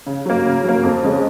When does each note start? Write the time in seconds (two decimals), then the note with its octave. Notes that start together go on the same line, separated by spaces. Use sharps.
0.06 C#3
0.26 F#3 A#3
0.45 C#3
0.64 F#3 A#3
0.83 F2
1.03 C#3 G#3 C#4